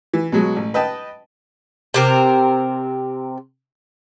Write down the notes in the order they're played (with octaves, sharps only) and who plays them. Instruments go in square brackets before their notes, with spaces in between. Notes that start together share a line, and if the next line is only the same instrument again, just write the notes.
[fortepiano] E3
B2 F#3 G#3
A1
B4 D#5 G5 A5
[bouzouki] C3 C4 A#4